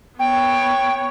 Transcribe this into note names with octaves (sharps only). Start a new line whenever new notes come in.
B3 C#5 G5